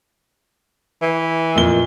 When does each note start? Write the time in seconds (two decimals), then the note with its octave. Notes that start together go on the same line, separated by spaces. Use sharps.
1.01 E3
1.55 F2 A#2 G7